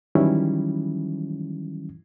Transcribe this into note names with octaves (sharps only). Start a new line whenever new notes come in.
D#3 E3 F#3 G3 C#4 E4